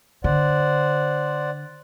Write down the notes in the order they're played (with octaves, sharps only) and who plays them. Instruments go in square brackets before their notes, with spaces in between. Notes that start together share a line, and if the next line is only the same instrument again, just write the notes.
[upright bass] D3 [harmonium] C5 D5 F#5